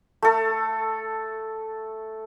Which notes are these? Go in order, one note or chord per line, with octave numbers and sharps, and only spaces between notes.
A3 A4